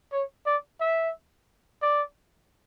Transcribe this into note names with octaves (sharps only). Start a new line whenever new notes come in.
C#5
D5
E5
D5